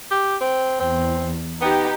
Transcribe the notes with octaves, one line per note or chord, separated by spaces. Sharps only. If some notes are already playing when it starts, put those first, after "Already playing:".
G4
C4
E2 C4
B3 D#4 G4